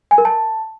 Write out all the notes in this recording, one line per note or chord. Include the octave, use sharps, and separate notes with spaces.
G#5
A#4
A5